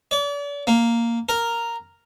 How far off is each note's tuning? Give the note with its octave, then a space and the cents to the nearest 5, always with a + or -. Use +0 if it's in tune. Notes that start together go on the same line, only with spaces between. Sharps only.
D5 -40
A#3 -5
A#4 -5